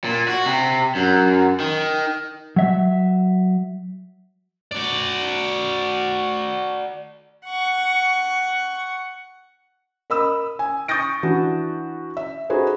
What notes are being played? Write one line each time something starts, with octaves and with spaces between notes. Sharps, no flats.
A#2
F#4
C3
F#2
D#3
F#3 E5
F#4 D5
F#5 C#6
A#4 D#5 B5 D#6 E6
G#5
C#6 D#6 G6 A6 A#6 D7
E3 D4 F#4
E5
D#4 F#4 G#4 A4 B4 C5